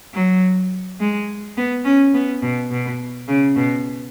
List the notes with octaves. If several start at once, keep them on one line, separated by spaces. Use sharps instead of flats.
F#3
G#3
B3
C#4
B3
B2
B2
C#3
B2